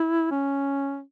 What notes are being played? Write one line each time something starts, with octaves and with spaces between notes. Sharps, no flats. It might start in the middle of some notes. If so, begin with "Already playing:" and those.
Already playing: E4
C#4